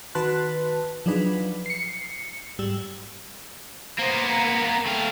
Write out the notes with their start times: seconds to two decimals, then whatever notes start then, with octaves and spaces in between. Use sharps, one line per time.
0.15 D#3 F#4 B4 A5 C6 F#6
1.06 F3 F#3 D4 D#4 G#4 B4
1.66 C7 C#7
2.59 G#2 G3 E6
3.98 A#3 B3 C5
4.27 A#5
4.86 A3 F5 G5